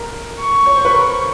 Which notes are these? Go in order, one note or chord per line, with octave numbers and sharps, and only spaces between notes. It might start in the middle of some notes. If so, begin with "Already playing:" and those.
Already playing: A#4
C#6
C#5
C5
B4
A#4